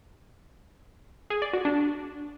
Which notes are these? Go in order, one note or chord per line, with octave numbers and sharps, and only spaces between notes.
G#4
D5
F#4
D4